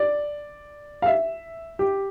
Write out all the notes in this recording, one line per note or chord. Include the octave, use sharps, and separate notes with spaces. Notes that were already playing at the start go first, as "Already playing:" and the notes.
Already playing: D5
F5
E5
G4